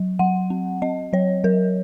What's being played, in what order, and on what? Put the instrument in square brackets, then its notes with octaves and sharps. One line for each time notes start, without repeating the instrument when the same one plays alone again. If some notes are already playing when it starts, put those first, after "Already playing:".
Already playing: [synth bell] F#3
F#3 F#5
C4
C4 D#5
F#3 C#5
F#3 A#4